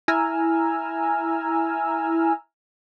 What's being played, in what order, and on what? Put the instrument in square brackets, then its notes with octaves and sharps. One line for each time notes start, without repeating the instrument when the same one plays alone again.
[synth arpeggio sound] E4 G#5 A#5 E6 F6